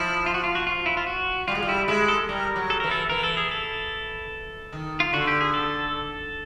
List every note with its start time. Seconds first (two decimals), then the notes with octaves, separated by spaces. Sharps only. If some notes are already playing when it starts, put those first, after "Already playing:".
Already playing: F3 E4
0.26 F4
0.34 F#4
0.44 F4
0.55 F#4
0.67 F4
0.86 E4
0.97 F4
1.07 F#4
1.48 G3 F4
1.55 G#3
1.62 G3
1.69 E4
1.88 G#3 E4
2.08 A4
2.29 G3 A#4
2.56 F#3
2.70 A4
2.80 E3 A#4
2.91 A4
3.09 E3 A#4
3.23 A4
3.37 G#4
3.51 A4
4.72 D#3
5.00 F4
5.13 D3 F#4
5.27 G4
5.41 G#4
5.54 A4